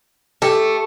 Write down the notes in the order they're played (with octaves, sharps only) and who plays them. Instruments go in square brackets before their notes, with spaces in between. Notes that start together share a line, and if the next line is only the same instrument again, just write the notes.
[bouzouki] A3 [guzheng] G4